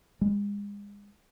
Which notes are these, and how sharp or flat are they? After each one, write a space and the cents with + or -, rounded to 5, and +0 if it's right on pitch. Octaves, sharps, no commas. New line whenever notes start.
G#3 -35